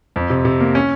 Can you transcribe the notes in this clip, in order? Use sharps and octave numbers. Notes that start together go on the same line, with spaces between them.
F2
C3
C3
A#3
C#4